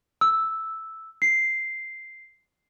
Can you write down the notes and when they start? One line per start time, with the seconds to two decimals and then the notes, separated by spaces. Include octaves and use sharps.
0.21 E6
1.22 C7